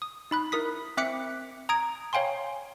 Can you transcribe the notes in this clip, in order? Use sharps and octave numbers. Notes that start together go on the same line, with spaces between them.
D#6
D#4 B5 F#6
E4 A#4 D#6 B6
C4 E5 D6 F#6 B6 C#7
A#5 D#6 G#6 D7
C#5 F5 G5 G#5 C6